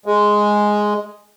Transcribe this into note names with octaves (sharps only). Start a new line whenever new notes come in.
G#3